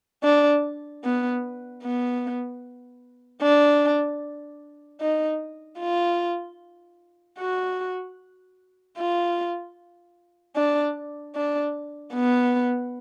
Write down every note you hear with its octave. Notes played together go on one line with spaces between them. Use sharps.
D4
B3
B3
D4
D#4
F4
F#4
F4
D4
D4
B3